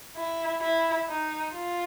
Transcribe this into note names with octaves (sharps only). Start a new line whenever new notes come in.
E4
E4
D#4
F4